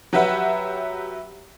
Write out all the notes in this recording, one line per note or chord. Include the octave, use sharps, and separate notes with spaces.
F#3 G4 B4 E5 F#5